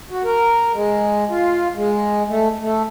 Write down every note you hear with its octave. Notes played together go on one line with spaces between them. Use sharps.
F#4
A#4
G#3
F4
G#3
A3
A3